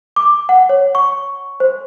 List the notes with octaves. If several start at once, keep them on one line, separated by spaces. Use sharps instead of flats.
D6
F#5
C#5
C#6
C5